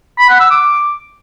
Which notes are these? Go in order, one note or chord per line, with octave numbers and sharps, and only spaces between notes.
B5
F#5
E6
D6